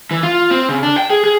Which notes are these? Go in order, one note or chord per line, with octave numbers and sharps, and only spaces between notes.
E3
F4
C4
C#3
D4
G5
G#4
G#4